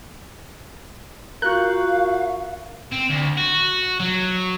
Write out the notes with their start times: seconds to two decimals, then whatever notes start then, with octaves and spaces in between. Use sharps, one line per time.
1.42 F4 F#4 A#4 F5 C#6 F#6 G6
2.93 C4
3.10 D2
3.38 F#4
4.00 F#3